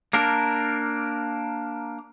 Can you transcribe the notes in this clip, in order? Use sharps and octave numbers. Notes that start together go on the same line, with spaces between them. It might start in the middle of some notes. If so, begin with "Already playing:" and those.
A#3 D4 A#4